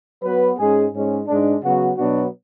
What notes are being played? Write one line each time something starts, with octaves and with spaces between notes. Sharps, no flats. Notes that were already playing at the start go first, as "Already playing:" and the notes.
F#3 B3 F#4 B4
G#2 G#3 C#4 G#4
G#2 G#3 C#4
G#2 G#3 D4
C#3 F#3 B3 F#4
B2 F#3 B3 D4 F#4